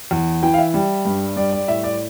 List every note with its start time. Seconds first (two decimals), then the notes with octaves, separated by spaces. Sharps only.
0.11 E2
0.43 E3 G5
0.54 F5
0.58 E5
0.74 G3
1.05 G2
1.36 G3 D5
1.53 D5
1.68 A2 E5
1.84 D5